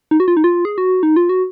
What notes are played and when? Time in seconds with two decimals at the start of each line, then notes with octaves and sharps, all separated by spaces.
0.11 D#4
0.20 F#4
0.28 F4
0.37 D#4
0.44 F4
0.65 G#4
0.78 F#4
1.03 D#4
1.16 F4
1.29 F#4